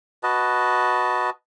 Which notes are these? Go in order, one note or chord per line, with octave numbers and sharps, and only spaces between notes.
F#4 B4 D#5 A5